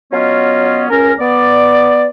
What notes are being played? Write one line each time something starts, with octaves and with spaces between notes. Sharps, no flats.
F#3 B3 C#4 F4 D#5
C#2 C#4 A#4
B3 D5